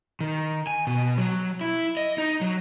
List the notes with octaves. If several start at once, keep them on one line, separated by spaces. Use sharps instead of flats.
D#3
G#5
B2
F#3
E4
D#5
D#4
F#3